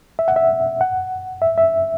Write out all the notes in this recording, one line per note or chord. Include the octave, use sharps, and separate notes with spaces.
E5
F#5
E5
F#5
E5
E5